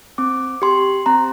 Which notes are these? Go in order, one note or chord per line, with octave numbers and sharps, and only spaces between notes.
C4 D6
G4 C6
C4 A#5